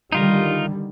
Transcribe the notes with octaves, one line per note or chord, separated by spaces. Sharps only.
D3 D#3 G3 D#4 F4 A#4